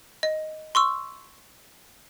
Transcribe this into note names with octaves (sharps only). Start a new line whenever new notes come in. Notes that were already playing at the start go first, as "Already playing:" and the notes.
D#5
C6 C#6 E6